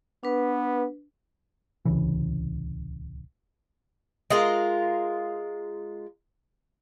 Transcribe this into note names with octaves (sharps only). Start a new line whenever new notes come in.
B3 D4 B4
D1 C2 C#3 E3
G#3 F4 A#4